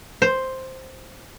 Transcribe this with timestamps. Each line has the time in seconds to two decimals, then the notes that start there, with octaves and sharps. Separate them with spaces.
0.22 C5